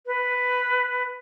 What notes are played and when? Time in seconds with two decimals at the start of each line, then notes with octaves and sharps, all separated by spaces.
0.06 B4